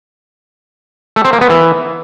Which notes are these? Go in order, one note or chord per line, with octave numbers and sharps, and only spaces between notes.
A3
C4
A#3
B3
E3